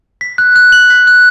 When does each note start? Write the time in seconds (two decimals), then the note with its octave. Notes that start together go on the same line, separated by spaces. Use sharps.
0.21 B6
0.38 F#6
0.56 F#6
0.72 F#7
0.90 B6
1.07 F#6